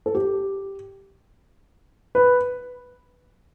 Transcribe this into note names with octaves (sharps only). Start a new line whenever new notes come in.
A4
G4
B4